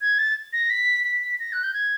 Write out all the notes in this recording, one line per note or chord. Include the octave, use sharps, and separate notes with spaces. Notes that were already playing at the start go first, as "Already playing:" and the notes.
G#6
A6
A#6
B6
B6
A#6
F#6
G6
G#6